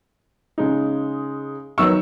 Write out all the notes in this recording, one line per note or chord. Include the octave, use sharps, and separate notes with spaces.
C#3 G#3 D#4
D#3 F#3 B3 D#4 C#6 E6